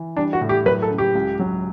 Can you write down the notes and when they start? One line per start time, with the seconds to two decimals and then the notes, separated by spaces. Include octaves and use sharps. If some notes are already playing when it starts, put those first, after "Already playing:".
Already playing: E3
0.16 G3 D4
0.33 F#4
0.41 A2
0.49 G4
0.66 F#3 B4
0.82 A4
0.91 C#3
0.98 G4
1.15 C#2
1.40 F#3